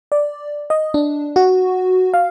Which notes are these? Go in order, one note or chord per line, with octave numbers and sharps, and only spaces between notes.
D5
D#5
D4
F#4
F5